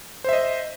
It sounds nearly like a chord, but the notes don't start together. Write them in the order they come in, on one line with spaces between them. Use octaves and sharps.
C5 E5 D#5